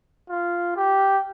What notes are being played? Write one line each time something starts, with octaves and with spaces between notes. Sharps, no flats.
F4
G4